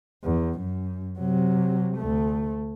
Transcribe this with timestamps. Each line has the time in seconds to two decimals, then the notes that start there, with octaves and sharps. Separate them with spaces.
0.24 E2
0.61 F#2
1.19 C3 F#3
1.97 D2 A3